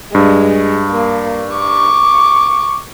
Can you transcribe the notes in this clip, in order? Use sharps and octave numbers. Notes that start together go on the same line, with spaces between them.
G2 G#3
A#3
C#6 D6